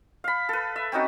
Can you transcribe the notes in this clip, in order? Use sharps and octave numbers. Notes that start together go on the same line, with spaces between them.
F5 B5
A4 B4
E5
C4 C#4 D#4 F#4